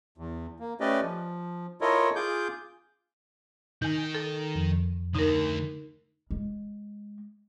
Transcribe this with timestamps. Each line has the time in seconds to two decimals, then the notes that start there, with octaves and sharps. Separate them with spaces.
0.18 E2
0.59 A#3
0.80 A3 C#4 G4 B4 D5 D#5
1.02 F3
1.81 E4 F4 A4 A#4 C#5 D#5
2.16 F4 G#4 D6 G6
3.82 D#3 D#4 G#5 G6
4.15 A4
4.55 F2
5.15 D3 A3 D#4 A#4
6.31 G#3